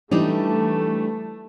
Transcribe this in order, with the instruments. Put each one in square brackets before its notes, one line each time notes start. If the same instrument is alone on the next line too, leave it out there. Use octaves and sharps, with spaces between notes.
[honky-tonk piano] E3 [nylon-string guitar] G3 D4 D#4 [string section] A3